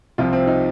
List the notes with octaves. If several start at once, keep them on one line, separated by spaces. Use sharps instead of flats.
C2 C3 F3 F4
C4
D#4